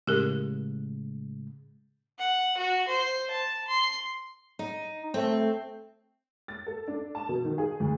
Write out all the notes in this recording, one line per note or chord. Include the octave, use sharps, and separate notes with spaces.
A2 C#3 G#3 G4 A#4
F#5
F#4
C5
A5
C6
D#4
A3 C4
A6
A4
D4
A5
B2
D#3
G#4
D2